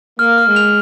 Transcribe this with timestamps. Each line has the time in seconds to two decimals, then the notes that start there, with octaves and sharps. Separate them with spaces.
0.19 A#3 F6
0.38 F6
0.47 G#3
0.56 F7